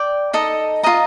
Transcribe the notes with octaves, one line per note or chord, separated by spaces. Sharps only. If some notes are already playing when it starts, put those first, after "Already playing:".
Already playing: D5 G5 D6
D#4 A4 D#5 A#5
F4 A4 D#5 A#5